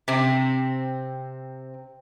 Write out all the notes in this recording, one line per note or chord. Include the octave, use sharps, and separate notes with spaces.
C3 C4